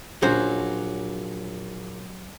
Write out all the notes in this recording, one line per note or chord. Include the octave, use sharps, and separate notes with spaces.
A#1 F#3 C#4 C5